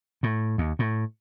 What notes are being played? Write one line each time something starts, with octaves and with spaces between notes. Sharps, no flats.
A2
D#2
A2